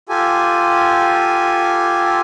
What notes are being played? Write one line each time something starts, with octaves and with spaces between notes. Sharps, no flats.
F4 G4 A4 G#5